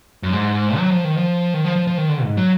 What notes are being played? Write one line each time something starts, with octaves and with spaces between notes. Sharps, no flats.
F#2
G#2
F#3
F3
D#3
F3
D#3
F3
F3
F3
D#3
D3
G#2
F#3